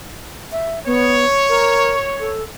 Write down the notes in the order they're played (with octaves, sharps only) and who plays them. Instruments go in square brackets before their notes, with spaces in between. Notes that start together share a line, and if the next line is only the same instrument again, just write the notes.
[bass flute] E5
[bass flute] B3 [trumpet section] C#5
[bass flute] A#4
A4